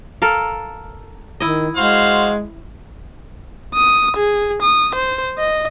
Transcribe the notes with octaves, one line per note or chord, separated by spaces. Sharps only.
A4 A#4 F5
D#3 E4 D#5
G#3 F#4 C5 F5
D#6
G#4
D#6
C5
D#5